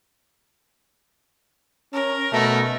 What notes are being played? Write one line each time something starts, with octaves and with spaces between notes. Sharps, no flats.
C#4 A#4
B2 A3